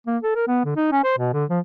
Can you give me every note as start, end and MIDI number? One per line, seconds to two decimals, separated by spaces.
0.07 0.17 58
0.23 0.35 69
0.35 0.44 70
0.47 0.61 59
0.64 0.75 50
0.76 0.88 63
0.92 1.00 61
1.04 1.14 72
1.18 1.32 47
1.33 1.44 50
1.50 1.59 53